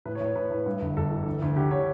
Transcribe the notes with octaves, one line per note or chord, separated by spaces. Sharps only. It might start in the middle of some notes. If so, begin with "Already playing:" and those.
A2 B4
C#5
A2
C#5
A2 B4
A2
G2
G1
G1 A4
E3
D2
D2
D3 G4
D3 C#5